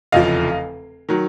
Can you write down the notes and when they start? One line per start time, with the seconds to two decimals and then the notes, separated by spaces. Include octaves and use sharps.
0.12 F1 E2 C#3 F3 D#5 F5
1.09 D#3 F#3